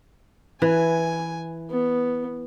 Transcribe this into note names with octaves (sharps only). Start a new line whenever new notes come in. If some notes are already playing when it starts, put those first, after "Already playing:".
E3 B4 G#5
B3